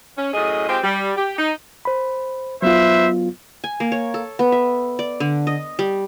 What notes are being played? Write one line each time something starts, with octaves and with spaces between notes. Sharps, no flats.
C#4
F#2 A2 G#4 D#5
G#3 C4 F4 G4
G3
G4
D#4
C5 B5
F#3 B3 F4 B4 C5 E5
G#5
A#3
C#5
A4
B3
E5
D5
D3
D#5
G3